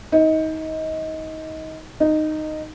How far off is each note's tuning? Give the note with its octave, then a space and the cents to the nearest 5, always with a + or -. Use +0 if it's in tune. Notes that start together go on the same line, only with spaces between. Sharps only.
D#4 +25
D#4 -10